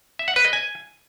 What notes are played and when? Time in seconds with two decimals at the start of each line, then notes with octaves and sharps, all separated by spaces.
0.19 E5
0.28 F#5
0.36 B4
0.45 D#5
0.53 G#5